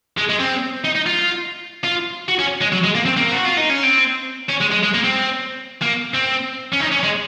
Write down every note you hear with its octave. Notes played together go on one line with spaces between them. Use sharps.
G#3
G#3
C4
D#4
D#4
F4
F4
F#4
C#4
G#3
F#3
G#3
A#3
C4
A#3
F#4
F4
D#4
C#4
C4
C#4
G#3
G#3
G#3
A#3
C4
A#3
C4
C#4
D#4
C#4
G#3